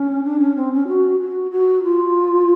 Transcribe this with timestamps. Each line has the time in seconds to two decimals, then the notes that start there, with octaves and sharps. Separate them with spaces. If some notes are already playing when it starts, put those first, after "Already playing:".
Already playing: C#4
0.24 D4
0.40 C#4
0.56 C4
0.72 C#4
0.88 F#4
1.20 F#4
1.51 F#4
1.83 F4